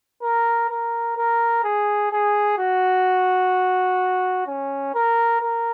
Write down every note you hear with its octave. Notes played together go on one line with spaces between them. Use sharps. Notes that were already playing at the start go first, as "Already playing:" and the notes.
A#4
A#4
A#4
G#4
G#4
F#4
C#4
A#4
A#4